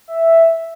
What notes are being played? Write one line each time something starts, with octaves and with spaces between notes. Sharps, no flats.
E5